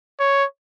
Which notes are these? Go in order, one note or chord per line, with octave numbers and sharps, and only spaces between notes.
C#5